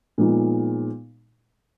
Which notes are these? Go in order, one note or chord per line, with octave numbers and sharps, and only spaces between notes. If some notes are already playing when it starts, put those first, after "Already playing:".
A#2 F3 G#3 B3 D#4